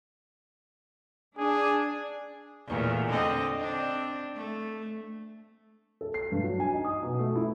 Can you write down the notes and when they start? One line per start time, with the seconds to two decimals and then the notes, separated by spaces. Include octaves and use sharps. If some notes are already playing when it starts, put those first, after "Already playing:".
1.38 D4 G#4
2.68 E2 A#2 A3
3.09 D3 C4 D#5
3.55 C4 D4
4.35 A3
6.01 A4
6.14 C7
6.32 G2
6.43 F#3
6.60 G#5
6.72 D#4
6.85 D#6
7.03 B2
7.19 A3
7.36 E4